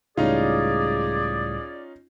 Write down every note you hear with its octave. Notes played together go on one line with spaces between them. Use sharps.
C#2 A2 G3 C#4 D#4 F4 G#4 D5